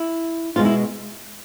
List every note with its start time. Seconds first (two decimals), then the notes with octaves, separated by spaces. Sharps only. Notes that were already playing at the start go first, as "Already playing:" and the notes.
Already playing: E4
0.56 B2 G#3 F4
0.65 E4